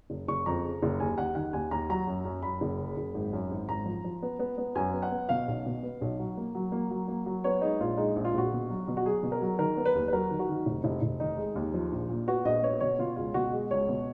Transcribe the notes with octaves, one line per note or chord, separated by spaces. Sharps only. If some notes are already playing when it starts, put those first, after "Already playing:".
F#1
F#1 C#6
F2 A#5
C#3
F#1
D#2 G#5
D#2 F#5
D#3 F#5
D#2 G#5
D#2 A#5
F#3 A#5
F#2
F#2
F#2 B5
F#1
C#3
F#1
G#1
F#2
G#1
G#1 A#5
F3
F3
B3
B3
B3
F#2 G#5
B3
F#5
B3
B2 F5
B1
B2
B3
B1
F#3
A#3
F#3
A#3
F#3
A#3
F#3
B3 C#5
G#3 D#4
A#1 F4
G#3 D#4
A#1
F4
A#1 F#4
B2
F#3
B2
F#4
F#3 G#4
B2
A#4
F#3
D#3 A#4
B3
B4
D#2
B4
F#3 A#4
D#3
F#4
D#3
F1
F1
F1
D#3 D#4
G#3
D#2
F3
A#1
A#2
B3 F#4
A#1 D#5
B3 C#5
B2 C#5
B2 F4
C#2 F4
B2 F#4
G#3
C#2 C#5
B2